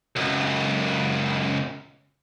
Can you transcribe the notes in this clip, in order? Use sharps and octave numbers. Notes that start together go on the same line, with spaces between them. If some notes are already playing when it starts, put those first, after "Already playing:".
C#2 F#2